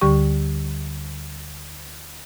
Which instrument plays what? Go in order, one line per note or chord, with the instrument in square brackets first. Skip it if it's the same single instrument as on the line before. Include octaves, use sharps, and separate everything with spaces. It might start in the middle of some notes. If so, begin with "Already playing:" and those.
[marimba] D2 D3 G3 G4 C#6